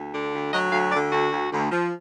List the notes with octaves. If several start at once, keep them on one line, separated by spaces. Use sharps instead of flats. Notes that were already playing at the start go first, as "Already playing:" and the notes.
Already playing: D2
D3
D2
F#3 D#5
D2 F5
D3 D5
D2 F#4
D2
D2
F3